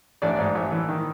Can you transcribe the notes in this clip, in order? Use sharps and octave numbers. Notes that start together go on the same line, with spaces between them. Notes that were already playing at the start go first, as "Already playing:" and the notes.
A1 D4 D5
G#2
A1
E3
D#3